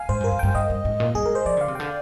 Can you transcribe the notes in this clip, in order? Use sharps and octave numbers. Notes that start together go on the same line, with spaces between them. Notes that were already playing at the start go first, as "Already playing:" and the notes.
Already playing: F5 G#5
G#2 C5
G2 A#4
F2
G2 G5
G2 D#5
G2
G#2
A#2
G2 G#4
G#2 A#4
C5
F3 D5
D3 F5
C3
D3 G5